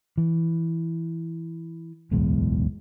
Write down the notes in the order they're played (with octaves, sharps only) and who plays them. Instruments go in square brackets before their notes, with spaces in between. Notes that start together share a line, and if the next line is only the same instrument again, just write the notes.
[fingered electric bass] E3
D1 B1 E2 G#3